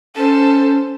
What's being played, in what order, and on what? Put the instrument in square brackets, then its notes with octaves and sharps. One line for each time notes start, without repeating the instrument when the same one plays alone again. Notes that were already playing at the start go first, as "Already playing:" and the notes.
[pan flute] C#4 [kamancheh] A4 C5